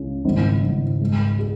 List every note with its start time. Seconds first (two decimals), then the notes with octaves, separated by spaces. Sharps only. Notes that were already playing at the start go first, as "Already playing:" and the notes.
Already playing: C#2 C#4
0.25 G#1
0.63 G#1
1.01 G#2
1.39 G#4